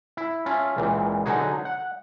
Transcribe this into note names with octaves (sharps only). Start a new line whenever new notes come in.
E4
C#4 F4 E5 A5
C#2 A#2 E3
D3 F#3 D#4 F#4 G#4
F#5